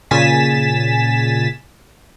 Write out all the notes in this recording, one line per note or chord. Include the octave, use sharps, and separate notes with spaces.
A#2 C#3 G#5 A6 B6 E7